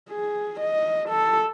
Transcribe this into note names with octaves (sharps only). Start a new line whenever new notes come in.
G#4
D#5
A4